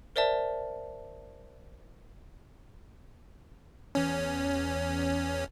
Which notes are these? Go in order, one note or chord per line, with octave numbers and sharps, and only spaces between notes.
A#4 C5 D5 E5 A5
E2 C#4